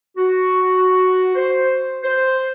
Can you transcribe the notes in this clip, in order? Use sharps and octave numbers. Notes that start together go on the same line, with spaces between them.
F#4
C5
C5